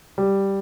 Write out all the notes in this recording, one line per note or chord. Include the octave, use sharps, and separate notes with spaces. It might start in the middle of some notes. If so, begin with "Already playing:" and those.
G3